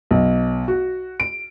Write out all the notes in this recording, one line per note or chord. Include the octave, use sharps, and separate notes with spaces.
B1
F#4
D7